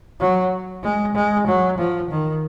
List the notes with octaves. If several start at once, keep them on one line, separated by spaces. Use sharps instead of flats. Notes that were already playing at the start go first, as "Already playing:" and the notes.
F#3
G#3
G#3
F#3
F3
D#3